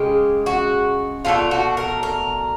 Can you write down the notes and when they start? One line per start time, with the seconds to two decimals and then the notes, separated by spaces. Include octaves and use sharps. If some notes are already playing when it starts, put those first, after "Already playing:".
Already playing: C#3 G#3 G4
0.46 F#4
1.25 B2 F#3 A3 D4 F4
1.51 F#4
1.77 A#4
2.03 A#4